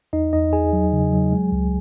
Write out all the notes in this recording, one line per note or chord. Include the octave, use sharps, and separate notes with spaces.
E2 D#4 D#5
E2 D#4 D#5
E2 G#4 G#5
F#3
C#3
F#3
G#3
C#2